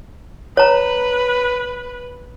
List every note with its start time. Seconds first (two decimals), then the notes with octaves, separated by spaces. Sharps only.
0.57 B4 C#5 A#5